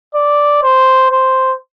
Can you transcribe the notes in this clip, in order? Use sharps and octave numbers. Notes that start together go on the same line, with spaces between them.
D5
C5
C5